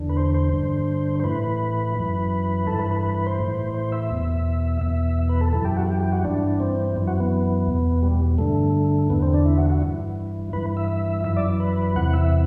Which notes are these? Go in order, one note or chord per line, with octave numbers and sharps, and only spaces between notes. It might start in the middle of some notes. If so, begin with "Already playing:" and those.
Already playing: E2 D3
B4
C5
C5
G2 D3
C5
A2 E3 B4
F#2 E3
G2 E3 A4
B4
B4
B4
B4
C5
A2 E3
C5
E5
E2 B2
E2 B2 E5
B4
A4
F#2 E3 A4
G4
F#4
G4
G4
F#4
G2 E3 D4
C4
F#2 E3
F#4
B3
E2 B2
G3
G2 D3 A3
E2 D3 B3
C4
D4
E4
F#4
F#4
G2 E3
G2 E3 B4
E5
E5
F#2 E3 E5
D5
B4
E2 C3 E3 F#5
E5